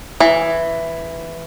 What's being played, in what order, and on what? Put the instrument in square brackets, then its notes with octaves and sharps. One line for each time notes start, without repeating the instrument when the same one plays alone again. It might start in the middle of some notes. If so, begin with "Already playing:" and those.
[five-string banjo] E3